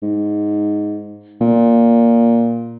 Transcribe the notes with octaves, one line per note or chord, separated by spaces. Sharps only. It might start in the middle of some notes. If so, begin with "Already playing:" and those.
G#2
A#2